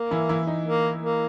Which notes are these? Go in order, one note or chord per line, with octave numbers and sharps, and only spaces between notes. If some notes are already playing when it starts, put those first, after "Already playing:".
Already playing: A#3
E3 E4
E3 E4
D#4
A#3
A#3